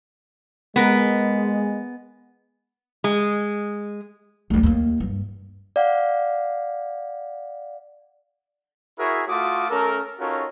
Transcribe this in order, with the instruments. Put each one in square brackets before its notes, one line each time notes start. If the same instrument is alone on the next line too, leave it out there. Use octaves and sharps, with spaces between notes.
[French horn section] G#3 [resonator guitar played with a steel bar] B3 A#4
[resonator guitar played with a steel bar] G#3
[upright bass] D2 G3
D#2 A#3
G2
[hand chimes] D5 F5 F#5
[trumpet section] E4 F#4 G#4 A#4 C#5 E5
A3 F4 F#4 D6 D#6
A3 C#4 A4 A#4
C#4 D#4 F4 F#4 A4 A#4